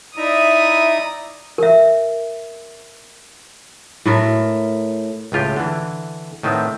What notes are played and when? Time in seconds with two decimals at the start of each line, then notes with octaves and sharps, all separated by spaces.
0.17 D#4 E4 D5 E5 A#5 D#6
1.58 A#4 E5
4.05 A2 A3 A#4
5.32 C#2 A2 F4 G4
5.56 D3 E3
6.43 A2 D#3 B3 C4